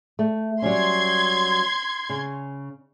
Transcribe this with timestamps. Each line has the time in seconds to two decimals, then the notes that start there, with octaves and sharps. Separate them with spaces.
0.19 A3
0.62 F#3 G3 C#4 C6 G#6
2.09 C#3